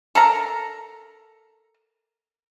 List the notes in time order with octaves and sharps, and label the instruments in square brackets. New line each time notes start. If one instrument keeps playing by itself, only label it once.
[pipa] A4 A#4 A#5